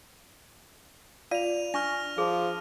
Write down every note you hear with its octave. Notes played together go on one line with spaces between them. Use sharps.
F4 D5 F5 D#7 F7
D4 C#6 F6 A#6
F3 G#4